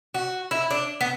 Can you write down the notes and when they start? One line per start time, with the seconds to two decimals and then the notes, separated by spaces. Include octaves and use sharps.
0.14 F#4
0.51 E4
0.71 D4
1.01 B3